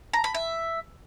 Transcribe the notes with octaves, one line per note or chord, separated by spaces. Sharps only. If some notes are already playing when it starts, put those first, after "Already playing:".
A#5
B5
E5